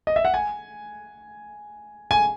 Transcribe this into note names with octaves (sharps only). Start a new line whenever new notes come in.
D#5
E5
F#5
G#5
G#5